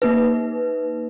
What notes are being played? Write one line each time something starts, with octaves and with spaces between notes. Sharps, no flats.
A#3 D#4 B4